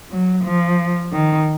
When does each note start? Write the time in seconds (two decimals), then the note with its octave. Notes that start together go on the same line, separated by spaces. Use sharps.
0.11 F#3
0.44 F3
1.13 D#3